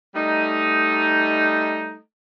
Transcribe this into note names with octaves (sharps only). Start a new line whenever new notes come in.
G3 A3 D#4